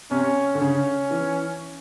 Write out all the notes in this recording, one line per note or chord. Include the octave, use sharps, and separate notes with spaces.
C3 C#4
D3
C#3 C#4
E3